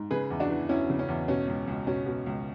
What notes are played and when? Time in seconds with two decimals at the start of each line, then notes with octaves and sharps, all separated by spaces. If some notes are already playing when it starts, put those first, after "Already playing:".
Already playing: G#2
0.11 C#3 G#4 B4
0.30 E2
0.40 D4 F#4
0.50 E3
0.69 E2 C#4 E4
0.90 C#3
0.99 C#4
1.08 E2
1.28 B2 C#4
1.48 C#2
1.67 C#2
1.87 B2 C#4
2.06 B2
2.26 C#2